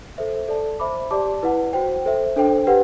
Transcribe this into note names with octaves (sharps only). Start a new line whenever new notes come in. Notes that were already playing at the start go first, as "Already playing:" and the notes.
A4 C5 E5
A4 D5 A5
C5 E5 B5 D6
G4 D5 A5 D6
E4 B4 F#5
F#4 C5 G5
A4 C5 E5
D4 A4 C5 G5
G4 B4 F#5